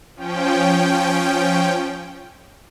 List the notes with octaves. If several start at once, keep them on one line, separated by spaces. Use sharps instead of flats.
F3 C#4 G5